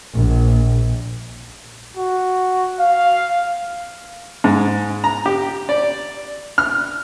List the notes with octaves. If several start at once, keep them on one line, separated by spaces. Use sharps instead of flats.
A#1
F#4
F5
G#2
A#5
G4
D5
F6